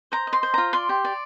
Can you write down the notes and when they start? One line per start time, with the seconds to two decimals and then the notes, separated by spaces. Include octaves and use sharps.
0.12 C5 A#5
0.27 D#5
0.33 C6
0.43 C5
0.54 F4 A#5
0.73 D5 C6
0.89 G4
1.04 D5